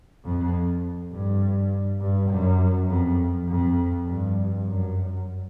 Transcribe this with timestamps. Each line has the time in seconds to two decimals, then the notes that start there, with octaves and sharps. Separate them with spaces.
0.25 F2
1.12 G2
2.01 G2
2.30 F#2
2.89 F2
3.48 F2
4.07 G2
4.66 F#2